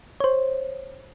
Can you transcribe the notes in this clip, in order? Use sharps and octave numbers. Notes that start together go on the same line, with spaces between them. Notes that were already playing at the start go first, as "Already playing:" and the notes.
C5 C#5